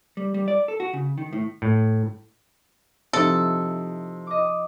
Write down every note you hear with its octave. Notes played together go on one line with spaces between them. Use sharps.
G3
G3
D5
A4
F#4
C#3
D#3
A2
A2
C3 F3 D#4 E4 A4
D#5 D6